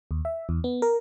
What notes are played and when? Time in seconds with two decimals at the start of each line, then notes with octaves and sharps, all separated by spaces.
0.11 D#2
0.25 E5
0.49 E2
0.64 B3
0.82 A#4